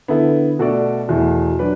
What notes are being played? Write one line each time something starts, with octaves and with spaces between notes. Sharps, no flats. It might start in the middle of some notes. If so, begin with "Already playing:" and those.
D3 B3 E4 A4
B2 A3 F#4 A4 D5
E2 B2 A3 E4
F#3 D4 B4 D5